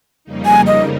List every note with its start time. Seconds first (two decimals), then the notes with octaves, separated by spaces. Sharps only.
0.24 F2 C#3 G3 A#3 D#4
0.46 G#5
0.67 D#5